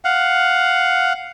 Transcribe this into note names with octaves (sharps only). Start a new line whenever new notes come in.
F5 F#5